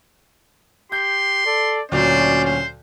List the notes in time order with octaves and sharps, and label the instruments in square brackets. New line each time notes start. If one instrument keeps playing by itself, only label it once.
[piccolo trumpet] G4 [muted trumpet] C6 [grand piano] G6
[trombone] A4 [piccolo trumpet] D5
[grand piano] D2 A#2 F#3 [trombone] C#4 [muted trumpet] C5 [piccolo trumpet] D5
[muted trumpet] C5